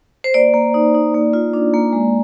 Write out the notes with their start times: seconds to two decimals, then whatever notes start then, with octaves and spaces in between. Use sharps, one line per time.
0.24 C5
0.34 A#3 D5
0.54 A#3
0.74 D#4
0.95 D#4
1.14 A#3
1.33 F4
1.54 D4
1.73 A#3
1.93 G#3